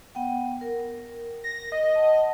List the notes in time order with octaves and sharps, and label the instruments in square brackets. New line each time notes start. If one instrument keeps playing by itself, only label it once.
[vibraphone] B3 F#5 G5
A#4
[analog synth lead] A#6
D#5
[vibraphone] F#5 A5